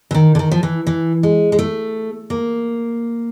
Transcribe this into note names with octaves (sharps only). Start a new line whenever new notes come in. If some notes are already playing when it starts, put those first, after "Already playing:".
E3
D#3
D3
D#3
F3
E3
E3
G#3
G#3
A3
A#3